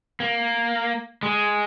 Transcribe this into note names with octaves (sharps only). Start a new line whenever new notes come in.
A#3
G#3